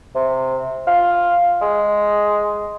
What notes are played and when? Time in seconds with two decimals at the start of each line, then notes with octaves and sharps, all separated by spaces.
0.15 C3
0.87 F4
1.61 G#3